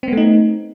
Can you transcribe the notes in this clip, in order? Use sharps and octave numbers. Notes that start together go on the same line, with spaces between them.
A3 B3 C4 D#4